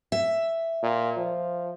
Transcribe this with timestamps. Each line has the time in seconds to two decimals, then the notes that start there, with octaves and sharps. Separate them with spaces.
0.12 E5
0.83 A#2
1.17 F3